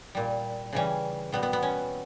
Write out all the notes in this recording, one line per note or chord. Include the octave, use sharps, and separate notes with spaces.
A#2 G3
C#3 E3 G3 C#4
B2 G3 B3
B3
B3
C#4